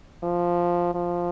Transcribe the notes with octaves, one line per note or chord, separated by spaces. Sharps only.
F3
F3